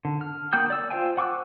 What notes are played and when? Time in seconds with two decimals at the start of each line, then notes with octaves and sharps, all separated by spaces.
0.05 D3
0.21 F6
0.53 A#3 F#4 G5 D#6 G6
0.70 D5 E6
0.90 F4 C5 F5 G5 G#5
1.17 F#5 C#6 D6 E6 F#6